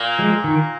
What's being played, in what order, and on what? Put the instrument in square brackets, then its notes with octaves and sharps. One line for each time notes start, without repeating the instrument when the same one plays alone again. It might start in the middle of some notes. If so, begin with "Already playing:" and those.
Already playing: [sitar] A#2 A#3
[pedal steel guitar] F3 G#3
D#3